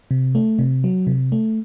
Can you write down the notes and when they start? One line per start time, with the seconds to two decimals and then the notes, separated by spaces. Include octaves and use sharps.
0.11 C3
0.35 A3
0.59 C3
0.84 F#3
1.07 C3
1.32 A3